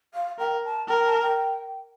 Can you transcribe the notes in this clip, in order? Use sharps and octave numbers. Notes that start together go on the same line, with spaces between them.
F5
A#4 G5
A5
A#4 G5
A5
G5